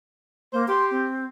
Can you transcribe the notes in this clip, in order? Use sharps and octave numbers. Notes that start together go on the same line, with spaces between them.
A#3 C5
G4 C6
C4